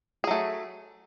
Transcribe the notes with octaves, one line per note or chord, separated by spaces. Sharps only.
F#3 A3 G#4